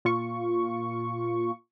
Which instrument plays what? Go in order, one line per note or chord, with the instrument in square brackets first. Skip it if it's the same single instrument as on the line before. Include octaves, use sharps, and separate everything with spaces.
[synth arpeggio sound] A#2 F4 C#6